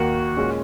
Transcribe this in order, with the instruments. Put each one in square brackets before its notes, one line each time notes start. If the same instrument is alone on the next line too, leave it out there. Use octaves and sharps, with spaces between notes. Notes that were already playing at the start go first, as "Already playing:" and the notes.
Already playing: [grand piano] D#2 D#3 A#3 [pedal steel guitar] F#4
[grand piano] A#2 G#3 C#4